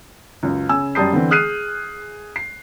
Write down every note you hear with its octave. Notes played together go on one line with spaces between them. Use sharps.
C#2 F#2
C#3 G#5 E6
F#2 G3 A5 D#6 G6 C7
D3 E3 C4
G#4 D#6 F6 F#6 C7 D#7
C7